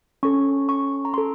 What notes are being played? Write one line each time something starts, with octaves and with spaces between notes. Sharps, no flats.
C#4 A4 C#6
C#6
A#5
C#4 A4 C6